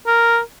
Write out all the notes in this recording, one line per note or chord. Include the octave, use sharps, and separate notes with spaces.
A#4